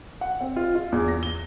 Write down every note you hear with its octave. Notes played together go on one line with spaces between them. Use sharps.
F#5
C4
F4
F4
E2
A#6
G7